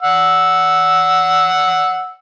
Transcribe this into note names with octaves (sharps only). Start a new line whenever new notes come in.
F#5 E6